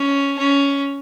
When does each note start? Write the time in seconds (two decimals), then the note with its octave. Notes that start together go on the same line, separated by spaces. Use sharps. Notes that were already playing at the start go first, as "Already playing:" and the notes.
Already playing: C#4
0.38 C#4